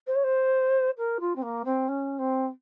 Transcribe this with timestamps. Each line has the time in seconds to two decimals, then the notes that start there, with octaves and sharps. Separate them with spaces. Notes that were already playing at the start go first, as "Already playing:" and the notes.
0.07 C5
0.16 C#5
0.24 C5
0.98 A#4
1.20 F4
1.36 C4
1.42 A#3
1.65 C4
1.88 C#4
2.19 C4